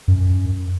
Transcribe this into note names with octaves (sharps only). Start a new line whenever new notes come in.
F#2